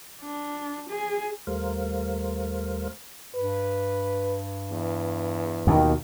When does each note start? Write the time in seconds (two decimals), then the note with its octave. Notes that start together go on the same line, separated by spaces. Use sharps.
0.21 D4
0.89 G#4
1.47 D#2 G3 A3 A#4 C5 F5
3.36 G2 B4
4.71 E2
5.67 D#2 B2 D#3